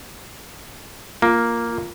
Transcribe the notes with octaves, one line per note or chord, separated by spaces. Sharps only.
A#3 F4